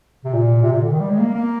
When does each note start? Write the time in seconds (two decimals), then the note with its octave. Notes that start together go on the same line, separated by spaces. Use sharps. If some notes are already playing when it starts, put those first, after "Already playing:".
0.25 C3
0.33 A#2
0.62 C3
0.72 A#2
0.81 D3
0.91 D#3
1.00 G3
1.10 G#3
1.19 A#3
1.35 A#3